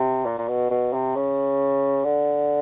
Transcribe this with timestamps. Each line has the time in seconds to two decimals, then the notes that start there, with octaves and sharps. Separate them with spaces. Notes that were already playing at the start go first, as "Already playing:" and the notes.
Already playing: C3
0.26 A#2
0.38 A#2
0.48 B2
0.71 B2
0.93 C3
1.15 C#3
2.05 D3